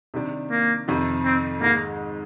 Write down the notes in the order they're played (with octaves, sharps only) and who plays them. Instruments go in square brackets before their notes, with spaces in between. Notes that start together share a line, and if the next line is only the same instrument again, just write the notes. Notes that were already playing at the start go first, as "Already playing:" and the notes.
[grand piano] C3 D#3 G3 D4
[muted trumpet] A#3
[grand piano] F2 C3 D#3
[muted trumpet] C4
[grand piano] G#2 D#3 G#3 [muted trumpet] A#3